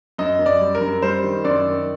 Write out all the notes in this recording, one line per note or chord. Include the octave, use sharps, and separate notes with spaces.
F#2 D#5
F#2
D5
G3
A#4
F#2
G3 C5
D#3
F#2 D5
D#3